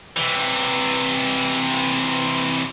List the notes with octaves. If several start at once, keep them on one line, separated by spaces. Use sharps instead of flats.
C3 E3